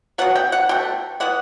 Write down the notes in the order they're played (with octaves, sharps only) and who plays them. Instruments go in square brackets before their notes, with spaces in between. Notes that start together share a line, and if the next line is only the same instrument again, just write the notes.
[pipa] B2 F#3 B3 F#5
G5
F#5
B2 A3 G5
E3 B3 F#5